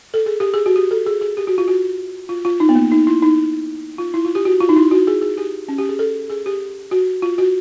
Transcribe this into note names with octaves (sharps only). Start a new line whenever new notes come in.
A4
G#4
G4
G#4
F#4
G4
A4
G#4
G#4
G4
F#4
F4
F#4
F4
F4
D#4
B3
A#3
D#4
E4
D#4
F4
E4
F4
G4
F#4
F4
D#4
E4
F#4
G#4
G#4
G4
C#4
G4
G#4
A4
G#4
G4
F#4
F4
F#4